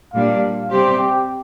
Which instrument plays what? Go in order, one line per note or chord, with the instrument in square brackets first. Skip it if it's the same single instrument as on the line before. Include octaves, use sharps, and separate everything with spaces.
[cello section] A#2 G3 A#3 D4 [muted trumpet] F5
[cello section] C3 G3 C4 G4 [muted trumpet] C5
[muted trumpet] G4